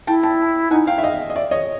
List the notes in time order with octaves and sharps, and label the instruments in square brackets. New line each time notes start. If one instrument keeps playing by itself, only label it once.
[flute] E4 [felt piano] G5 A5
[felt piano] G5 A5
[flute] D#4 [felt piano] F#5 G#5
[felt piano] F5 G5
E5
D#5 F5
D#5
D5 E5
C#5 D#5